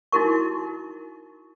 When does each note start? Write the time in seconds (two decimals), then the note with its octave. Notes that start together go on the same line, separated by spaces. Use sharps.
0.12 D#4 E4 F#4 A#4 C#6